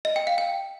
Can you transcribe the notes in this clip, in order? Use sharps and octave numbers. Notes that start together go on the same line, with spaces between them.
D#5
G5
F5
G5